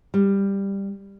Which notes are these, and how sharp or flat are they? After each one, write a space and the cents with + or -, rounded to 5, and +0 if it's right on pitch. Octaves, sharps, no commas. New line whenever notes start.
G3 +10